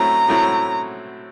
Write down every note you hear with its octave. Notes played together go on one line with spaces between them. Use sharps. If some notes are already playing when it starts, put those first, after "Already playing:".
Already playing: A2 F#3 A3 C4 E4 A#5
A2 F#3 A3 C4 E4